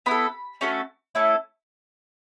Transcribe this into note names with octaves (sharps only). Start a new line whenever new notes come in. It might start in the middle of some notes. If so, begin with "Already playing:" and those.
B3 E4 A4 B5
A3 C#4 F#4 A4
A3 C#4 E4 A4